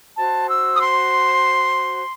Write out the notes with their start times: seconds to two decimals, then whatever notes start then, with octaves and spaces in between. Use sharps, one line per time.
0.17 F#4 C5 A5
0.48 E6
0.75 D#6
0.80 C6